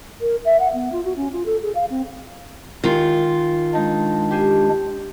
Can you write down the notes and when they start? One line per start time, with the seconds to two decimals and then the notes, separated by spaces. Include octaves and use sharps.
0.21 A#4
0.45 E5
0.60 F#5
0.73 B3
0.92 F4
1.04 F#4
1.16 C#4
1.32 F4
1.46 A4
1.62 G#4
1.75 F5
1.90 C4
2.84 D#3 G#3 F4
3.75 G#3 D4 D#4
4.31 G4 C5 G#5